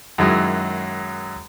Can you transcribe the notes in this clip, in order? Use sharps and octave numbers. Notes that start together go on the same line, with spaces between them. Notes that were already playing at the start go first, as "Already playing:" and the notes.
F#2 D#3 F#3 G#3 E4 D#6